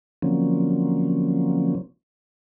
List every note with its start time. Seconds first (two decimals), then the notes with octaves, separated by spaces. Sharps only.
0.22 D3 F3 F#3 A#3 C4 C#4